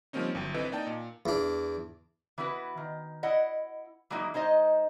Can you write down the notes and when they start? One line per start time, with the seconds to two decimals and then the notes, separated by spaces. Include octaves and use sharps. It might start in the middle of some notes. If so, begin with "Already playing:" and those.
0.13 F3 G3 A#3 C4 C#4 D#4
0.35 G1 F#3 G5
0.54 E3 C4 A4 B4 D#5
0.72 A#3 D#4 D5 D#5 G5 A5
0.87 A#2
1.26 E2 D4
2.38 E3 B3 E4 F#4 B4
2.77 D#3
3.23 E4 D#5 F#5
4.10 E3 F#3 G#3 A#3 D#4 E4
4.34 G#3 D#4 C5 D#5